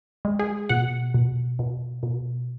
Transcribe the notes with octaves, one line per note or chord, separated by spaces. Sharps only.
G#3
G#4
B2 F#5
B2
B2
B2